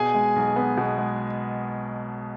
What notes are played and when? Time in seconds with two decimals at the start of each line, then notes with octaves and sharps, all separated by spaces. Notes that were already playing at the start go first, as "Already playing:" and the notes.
Already playing: B2 G#4 G#5
0.14 G#3
0.36 B1
0.56 B3
0.77 B2
0.98 G#3